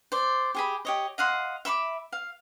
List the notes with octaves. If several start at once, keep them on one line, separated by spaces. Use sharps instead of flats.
C5 D5
G4 G#4 B5
G4 C#5 D#5
D#5 F5 F#5 C6
E5 B5 C6 D6
F5